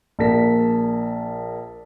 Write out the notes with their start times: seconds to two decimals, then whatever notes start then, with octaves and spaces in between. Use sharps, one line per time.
0.19 A#1 A#3 A5 B6